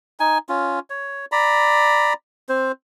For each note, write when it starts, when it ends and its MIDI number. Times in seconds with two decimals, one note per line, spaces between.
0.20 0.38 63
0.20 0.38 80
0.49 0.79 61
0.49 0.79 65
0.90 1.25 73
1.32 2.13 74
1.32 2.13 82
1.32 2.13 83
2.49 2.72 60
2.49 2.72 72